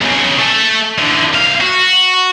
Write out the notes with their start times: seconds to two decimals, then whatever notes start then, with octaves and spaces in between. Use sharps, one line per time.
0.01 B1 C#3
0.39 A3 A4
0.98 D3 E3
1.34 C2 F5
1.61 F#4